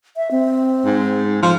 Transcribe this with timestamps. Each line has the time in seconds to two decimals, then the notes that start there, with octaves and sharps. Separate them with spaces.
0.17 E5
0.31 C4
0.85 G#2
1.42 F3